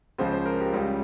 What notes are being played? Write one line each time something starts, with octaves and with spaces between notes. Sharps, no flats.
C#2 C#3 F3 C5
C5
A#4
G4
C#2 C#3 G3 F4